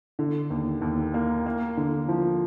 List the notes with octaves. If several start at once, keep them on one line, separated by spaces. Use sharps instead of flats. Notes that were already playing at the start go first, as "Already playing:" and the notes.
D3
D#2
D#2
A#3
A#3
D3
F3